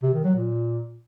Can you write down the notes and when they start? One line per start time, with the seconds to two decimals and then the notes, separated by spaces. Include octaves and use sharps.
0.03 C3
0.13 D#3
0.24 F#3
0.35 A#2